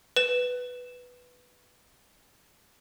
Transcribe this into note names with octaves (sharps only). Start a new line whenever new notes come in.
B4 E7